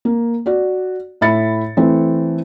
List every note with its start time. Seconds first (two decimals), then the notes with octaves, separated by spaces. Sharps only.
0.05 A#3
0.46 F#4 D5
1.21 A2 E5 B5 A6 C#7
1.77 E3 A3 C4